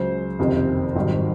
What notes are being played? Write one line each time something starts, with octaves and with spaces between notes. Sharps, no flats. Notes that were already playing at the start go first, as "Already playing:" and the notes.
Already playing: C#2 C#3 F#3 C5
F#1 F2 C3 D#3
G#1 G2 D#3 F#3